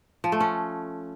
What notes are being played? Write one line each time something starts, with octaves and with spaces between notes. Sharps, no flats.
F3
A3
C#4